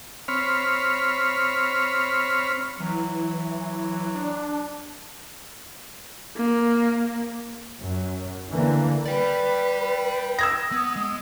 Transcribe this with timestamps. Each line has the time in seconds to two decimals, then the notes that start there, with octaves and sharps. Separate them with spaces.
0.28 C4 C#5 B5 F6
2.80 E3 F#3
4.14 D4
6.37 A#3
7.81 F#2
8.52 D3 E3 A#3
9.06 B4 D5 G5
10.39 D#6 E6 G#6 A#6
10.72 B3
10.96 G#3